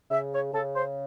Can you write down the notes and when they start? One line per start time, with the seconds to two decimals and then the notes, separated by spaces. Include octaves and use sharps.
0.11 C#3 E5
0.32 C#5
0.53 C#3 A4
0.75 C5